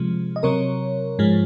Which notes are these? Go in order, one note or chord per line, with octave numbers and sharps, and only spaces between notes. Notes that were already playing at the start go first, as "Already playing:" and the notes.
Already playing: C3 F3 G#3
D#5
C3 F#3 A#4 C#5
G#2 F3 G#3